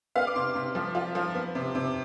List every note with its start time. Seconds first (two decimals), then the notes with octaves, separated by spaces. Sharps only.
0.16 B3 F5
0.27 D6
0.35 C3 C6
0.55 C3 C6
0.75 F3
0.95 F4
1.15 F3
1.35 B3
1.55 C3
1.75 C3